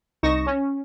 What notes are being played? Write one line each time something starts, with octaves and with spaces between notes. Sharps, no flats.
C2 D#4 C#6 A#6 E7
C#4